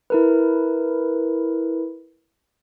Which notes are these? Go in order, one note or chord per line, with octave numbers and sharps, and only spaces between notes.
E4 A#4 B4